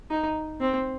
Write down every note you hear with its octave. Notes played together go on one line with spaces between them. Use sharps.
D#4
C4